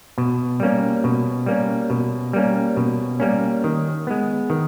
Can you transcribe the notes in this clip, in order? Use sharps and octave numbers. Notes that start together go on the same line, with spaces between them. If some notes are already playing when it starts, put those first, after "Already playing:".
B2
G3 A#3 C#4
B2
G3 A#3 C#4
B2
G3 A#3 C#4
B2
G3 A#3 C#4
D#3
G#3 B3
D#3